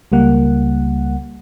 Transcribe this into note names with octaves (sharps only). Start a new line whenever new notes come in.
C#2 G3 A#3 F#5